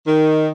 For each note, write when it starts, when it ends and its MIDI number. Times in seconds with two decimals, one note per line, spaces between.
0.06 0.50 51